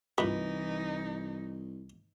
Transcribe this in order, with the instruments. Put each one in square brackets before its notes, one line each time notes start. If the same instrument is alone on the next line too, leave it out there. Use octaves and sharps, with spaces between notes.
[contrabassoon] C2 [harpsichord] G2 A#2 E4 [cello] E3 D#4 [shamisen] B4 D#5